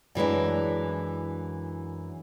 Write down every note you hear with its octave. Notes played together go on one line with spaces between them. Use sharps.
F#2 E3 G#3 D4